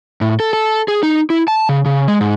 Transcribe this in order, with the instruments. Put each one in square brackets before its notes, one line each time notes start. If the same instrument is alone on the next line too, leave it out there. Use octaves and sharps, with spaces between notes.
[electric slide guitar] A2
A4
A4
G#4
D#4
E4
A5
C#3
C#3
G#3
G#2